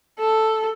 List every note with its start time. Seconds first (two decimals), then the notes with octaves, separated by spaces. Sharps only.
0.19 A4